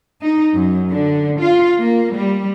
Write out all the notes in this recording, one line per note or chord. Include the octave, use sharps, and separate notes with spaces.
D#4
F#2
D3
F4
A#3
G3